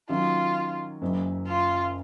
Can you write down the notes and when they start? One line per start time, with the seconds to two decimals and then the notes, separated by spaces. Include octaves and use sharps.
0.09 D#3 F#3 C#4 F4
1.02 F#1 F#2 C#3
1.47 F4